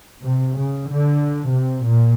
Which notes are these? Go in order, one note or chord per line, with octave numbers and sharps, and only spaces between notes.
C3
C#3
D3
C3
A#2